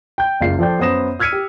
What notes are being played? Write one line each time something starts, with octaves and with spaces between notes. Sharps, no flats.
G5 G6
F#1 C#2 F4 D5 C7
F3 A4 D5 G5 G6
F#2 B3 C5 D#6 A#6 E7
E6 F6 G#6 B6 C#7 D#7
G4